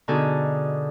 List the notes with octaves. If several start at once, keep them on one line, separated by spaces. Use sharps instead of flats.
B2 D3 D#4 G#4 A4